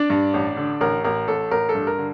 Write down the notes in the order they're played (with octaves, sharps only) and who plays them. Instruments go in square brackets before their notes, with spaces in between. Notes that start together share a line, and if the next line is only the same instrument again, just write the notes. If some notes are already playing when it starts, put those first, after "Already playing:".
Already playing: [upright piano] D4 D5
G2
A1
D3
A1 A#4
A1 A#4
A1 A4
A1 A#4
A4
G2
A#4
D3